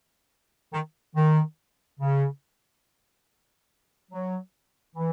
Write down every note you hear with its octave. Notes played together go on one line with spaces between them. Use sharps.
D#3
D#3
C#3
F#3
E3